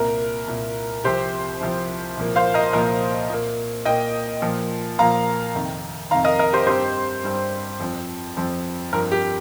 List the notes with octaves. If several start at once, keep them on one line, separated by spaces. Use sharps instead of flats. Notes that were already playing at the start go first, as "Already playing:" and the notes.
Already playing: C2 A#2 A#3 A#4
C2 A#2 A#3
C2 C3 F3 C4 G4 C5
C2 C3 F3 C4
C2 A#2 F3 A#3
C5 F5
A#4 D#5
C2 A#2 F3 A#3 A#4 D#5
A#2 A#3
A#2 A#3 D#5 G5
A#2 F3 A#3
A#2 F3 A#3 F5 A#5
F2 C3 D#3
F2 C3 D#3 F5 A#5
A#4 D#5
A#4 D#5
G4 C5
G2 G3 C4 G4 C5
G2 G3 C4
F2 F3 C4
F2 F3 C4
G2 F3 C4 A#4
G4